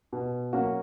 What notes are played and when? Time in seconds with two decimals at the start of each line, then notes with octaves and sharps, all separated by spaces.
0.12 B2
0.53 F#3 A#3 C#4 F#4